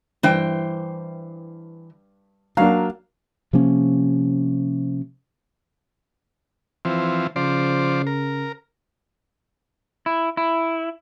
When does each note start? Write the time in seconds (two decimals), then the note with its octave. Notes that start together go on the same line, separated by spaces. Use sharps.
0.23 G2 E3 C5 G5
2.57 F#3 A#3 D4 F5
3.53 C3 F3 A#3 C#4
6.85 E3 F3 C4
7.36 C#3 F3 C5 D5
8.07 A#4
10.06 E4
10.37 E4